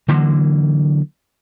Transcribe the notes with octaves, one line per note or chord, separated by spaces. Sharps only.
D3 E3 F#3 A#3